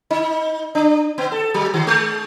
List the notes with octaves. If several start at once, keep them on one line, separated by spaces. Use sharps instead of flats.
D#4
D4
B3
A4
F#3
D#3
G#3